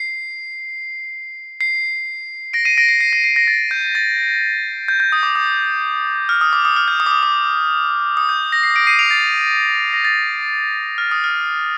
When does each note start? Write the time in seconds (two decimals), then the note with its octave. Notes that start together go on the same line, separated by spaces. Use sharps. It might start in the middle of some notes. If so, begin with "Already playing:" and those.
Already playing: C7
1.61 C7
2.53 A#6 D7
2.65 C7 D#7
2.77 A#6 D7
2.89 C7
3.01 C7
3.13 A#6
3.24 C7
3.36 A#6
3.47 A6
3.71 G6
3.95 A6
4.88 G6
5.00 G6
5.12 D#6
5.23 D6
5.36 D#6
6.29 F6
6.41 D#6
6.53 D6
6.65 D#6
6.76 F6
6.88 G6
7.00 D#6
7.06 D6
7.11 D#6
7.23 D6
8.17 D#6
8.29 G6
8.52 A#6
8.63 C7
8.76 A#6 D7
8.87 C7 D#7
8.99 D7 F7
9.11 A6
9.93 A#6
10.05 A6
10.98 F6
11.11 D#6
11.24 F6